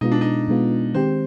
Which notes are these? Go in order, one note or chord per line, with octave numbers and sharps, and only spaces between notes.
B2 G#3 B3 D#4 F4
D4
D#4
B2 G#3 B3 F4
D#3 G#3 C4 G4 C5